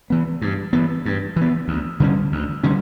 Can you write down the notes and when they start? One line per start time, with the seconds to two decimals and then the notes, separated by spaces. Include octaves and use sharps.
0.10 E3 B3
0.42 G2
0.73 E3 B3
1.05 G2
1.36 E3
1.41 B3
1.68 D2
2.00 D3 G3 C#4
2.32 D2
2.63 D3 G3 C#4